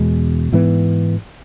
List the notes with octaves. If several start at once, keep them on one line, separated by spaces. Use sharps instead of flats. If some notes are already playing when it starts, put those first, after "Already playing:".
Already playing: E2 B2 G#3
G#2 E3 B3